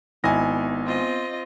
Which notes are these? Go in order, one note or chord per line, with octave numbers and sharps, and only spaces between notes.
G#1 B3 D#4 E4 G#5 A#6
C4 F4 D#5